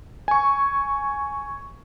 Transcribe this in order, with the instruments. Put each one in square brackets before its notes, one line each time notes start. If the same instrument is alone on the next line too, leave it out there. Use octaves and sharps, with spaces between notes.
[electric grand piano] G#5 C#6